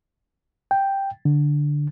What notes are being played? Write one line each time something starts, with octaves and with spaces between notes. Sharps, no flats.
G5
D3